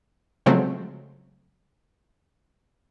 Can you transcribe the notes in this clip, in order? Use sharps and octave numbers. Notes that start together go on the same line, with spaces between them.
C#3 F3 F#3 G#3 A3 C4